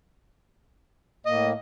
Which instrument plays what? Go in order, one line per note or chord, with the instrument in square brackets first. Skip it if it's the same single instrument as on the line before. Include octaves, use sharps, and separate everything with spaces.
[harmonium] A2 A#3 [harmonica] D#5